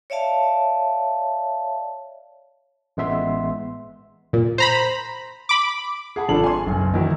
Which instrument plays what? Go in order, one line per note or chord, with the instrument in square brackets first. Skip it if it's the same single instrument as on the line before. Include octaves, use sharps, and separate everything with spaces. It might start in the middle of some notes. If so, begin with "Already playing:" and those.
[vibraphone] C#5 D5 E5 F5 A5
[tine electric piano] A1 G#3 B3 E5 C6
[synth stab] A#2
C5 A#5 B5
B5 D6
[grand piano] G#4 F#5 A5 B5
G#1 F3 D4 A4 F#7
G#5 C6
F#1 B1
D#3 E3 F#3 E4